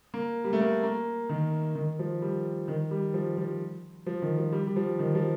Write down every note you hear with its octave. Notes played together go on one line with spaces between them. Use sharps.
A#3
G3
A3
A#3
A#3
D#3
D#3
F3
G3
D#3
G3
F3
F3
F3
D#3
F3
G3
G3
F3
D#3
F3